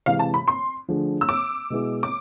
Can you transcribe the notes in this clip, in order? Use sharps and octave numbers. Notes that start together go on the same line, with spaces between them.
C3 E3 G#3 F5
A5
B5
C6
D3 F3 A3 D4 G#4
E6
D6
B2 G#3 B3 E4 G#4
D6